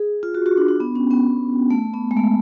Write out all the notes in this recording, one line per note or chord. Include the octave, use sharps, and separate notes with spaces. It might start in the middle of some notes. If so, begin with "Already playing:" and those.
Already playing: G#4
F4
F#4
F#4
D4
D4
B3
C#4
B3
A3
B3
G#3
A3